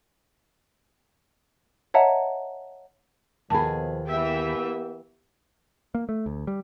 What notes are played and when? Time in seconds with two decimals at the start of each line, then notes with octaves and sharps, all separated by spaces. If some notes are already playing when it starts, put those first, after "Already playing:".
1.94 C#5 D#5 E5 F#5 A5 A#5
3.50 D#2 B2 F3 G#4 A5 B5
4.07 E3 A#3 B3 G4 E5 G5
5.95 A#3
6.09 A3
6.26 D2
6.47 G3